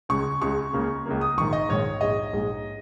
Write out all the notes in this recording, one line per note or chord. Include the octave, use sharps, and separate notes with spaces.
C#2 C#3 G#3 C#6
C#2 C#3 G#3 C#6
C#2 C#3 A#3
C#2 C#3 A#3
D#6
A#1 G#2 D#3 C#6
D#5
A#1 G#2 D#3 C#5
A#1 G#2 G#3 D#5
A#1 G#2 G#3